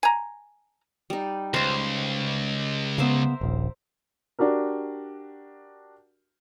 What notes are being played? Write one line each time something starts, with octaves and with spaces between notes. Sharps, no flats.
G#5 A#5
G3 D#4
C#2 C5 F5
C#3 B3 A#4 C5 E5
D#1 A#1
D4 F#4 G4 A#4